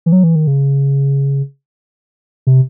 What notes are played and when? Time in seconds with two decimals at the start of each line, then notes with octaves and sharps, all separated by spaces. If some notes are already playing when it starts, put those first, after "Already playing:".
0.06 E3
0.12 F#3
0.24 E3
0.35 D#3
0.47 C#3
2.47 C3